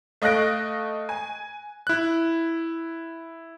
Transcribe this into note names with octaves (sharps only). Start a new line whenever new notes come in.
A3 D#5 F5 F#6 A#6 D7
G#5
E4 F#6